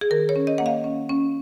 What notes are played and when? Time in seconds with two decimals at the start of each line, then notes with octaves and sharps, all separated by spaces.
0.01 G#4
0.11 D#3 A#4
0.29 C#5
0.36 C#4
0.47 D#5
0.58 A#3 F#5
0.66 F5
0.84 C#4
1.09 C#4